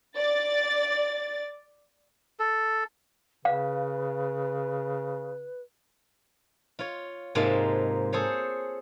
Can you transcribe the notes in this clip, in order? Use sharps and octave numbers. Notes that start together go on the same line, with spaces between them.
D5 A6
A4
C#3 B4 F5
F4 C#5
G#2 C3 G#3 A#3 F4 A5
G#4 A4 C5 C#5